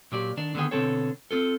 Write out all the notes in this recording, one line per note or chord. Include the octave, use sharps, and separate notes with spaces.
A#2 F#3 G4 D5
D#3 D4 D5
D3 D#3 B3 G#4 G5
B2 D3 D#3 C4 A4 C#5
C4 F4 A4